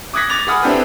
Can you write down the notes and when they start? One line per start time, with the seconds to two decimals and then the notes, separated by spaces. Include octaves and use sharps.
0.13 D6 D#6 F#6 G#6 A#6 B6
0.30 D6 A6 A#6 F7
0.47 G#4 F#5 B5 D#6 F6
0.62 C4 D4 E4 G4 A4 B4